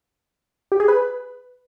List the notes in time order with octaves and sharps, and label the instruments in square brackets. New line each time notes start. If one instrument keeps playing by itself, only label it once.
[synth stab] G4
G#4
B4